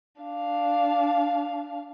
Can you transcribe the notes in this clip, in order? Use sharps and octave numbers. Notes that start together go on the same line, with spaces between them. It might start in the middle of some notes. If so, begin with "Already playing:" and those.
D4 F5